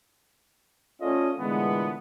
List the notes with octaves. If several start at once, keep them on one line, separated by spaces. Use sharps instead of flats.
A3 C#4 F4 A4 D5 D#5
A#2 D3 E3 G#3 A3 B3